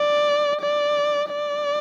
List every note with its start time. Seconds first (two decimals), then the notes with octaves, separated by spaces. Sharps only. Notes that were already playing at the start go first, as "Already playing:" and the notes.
Already playing: D5
0.61 D5
1.29 D5